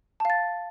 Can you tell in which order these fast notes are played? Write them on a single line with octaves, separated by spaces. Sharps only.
A5 F5 A6